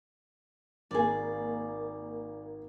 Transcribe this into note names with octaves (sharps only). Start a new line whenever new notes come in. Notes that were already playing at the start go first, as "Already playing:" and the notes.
G#1 A#3 G#4 D5